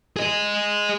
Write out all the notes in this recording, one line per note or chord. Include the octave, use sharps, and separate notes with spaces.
G#4 D#5